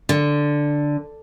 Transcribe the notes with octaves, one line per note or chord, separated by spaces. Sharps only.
D3